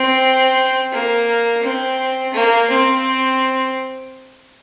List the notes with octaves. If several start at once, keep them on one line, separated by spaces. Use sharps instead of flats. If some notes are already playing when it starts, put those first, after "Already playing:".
Already playing: C4
A#3
C4
A#3
C4